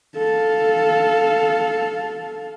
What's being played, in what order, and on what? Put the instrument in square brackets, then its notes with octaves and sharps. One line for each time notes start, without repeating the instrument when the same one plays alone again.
[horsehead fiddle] A4 F5